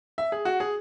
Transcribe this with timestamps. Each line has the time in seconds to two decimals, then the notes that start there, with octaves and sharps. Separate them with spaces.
0.18 E5
0.32 G#4
0.45 F#4
0.60 G#4